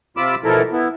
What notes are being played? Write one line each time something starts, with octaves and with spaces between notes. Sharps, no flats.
C3 F4 B5 D6 E6
B2 E3 F3 E4 A4 A#4
B3 E4